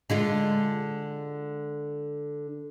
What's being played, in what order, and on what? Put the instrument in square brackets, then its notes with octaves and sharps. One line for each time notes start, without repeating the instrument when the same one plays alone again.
[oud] D3 G#3 F4